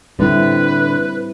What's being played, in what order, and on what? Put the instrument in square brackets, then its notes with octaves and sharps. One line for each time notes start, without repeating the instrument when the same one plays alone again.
[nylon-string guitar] A2 D3 [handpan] G3 C4 E4 [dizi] B4